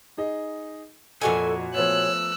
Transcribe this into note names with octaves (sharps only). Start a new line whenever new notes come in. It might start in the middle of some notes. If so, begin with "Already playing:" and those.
D#4 G#4 D#5
F2 A#2 F#4 A4 D#5 G#5
F3 A3 B3 C#5 E6 F#6